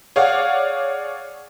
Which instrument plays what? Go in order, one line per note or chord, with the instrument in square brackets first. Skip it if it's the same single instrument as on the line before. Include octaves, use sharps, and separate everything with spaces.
[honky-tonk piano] G#4 C#5 D5 F5 F#5